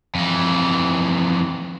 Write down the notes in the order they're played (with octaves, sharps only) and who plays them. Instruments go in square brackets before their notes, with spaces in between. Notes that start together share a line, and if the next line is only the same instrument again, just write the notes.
[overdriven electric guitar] F2 E3